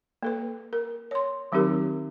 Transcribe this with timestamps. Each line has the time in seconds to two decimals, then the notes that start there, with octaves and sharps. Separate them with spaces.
0.23 A#3 A4 B4
0.73 A#4
1.11 C#5 C6
1.52 D#3 F#3 C4 D#4 G4 A#4